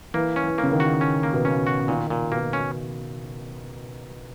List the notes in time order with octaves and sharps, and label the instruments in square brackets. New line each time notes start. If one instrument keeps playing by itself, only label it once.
[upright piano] E3 [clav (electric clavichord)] A#3
[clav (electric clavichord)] C#4
[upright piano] E3
[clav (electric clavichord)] A#3
[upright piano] C#3
D#3
[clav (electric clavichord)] F#4
C#4
A#3
[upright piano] B2
[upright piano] C#3 [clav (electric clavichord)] C#4
[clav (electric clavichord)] F#4
[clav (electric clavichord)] A#2 [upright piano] D#3
[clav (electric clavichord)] A#2
[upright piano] B2 [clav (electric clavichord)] A#3
[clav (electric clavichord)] C#4